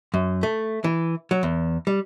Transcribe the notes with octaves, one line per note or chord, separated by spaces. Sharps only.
F#2
A3
E3
F#3
E2
G3